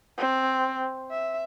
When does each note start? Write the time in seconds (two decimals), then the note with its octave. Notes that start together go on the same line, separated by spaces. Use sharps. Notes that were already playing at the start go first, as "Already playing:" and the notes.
0.18 C4
1.11 E5